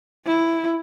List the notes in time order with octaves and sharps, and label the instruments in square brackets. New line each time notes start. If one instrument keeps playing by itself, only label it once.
[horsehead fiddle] E4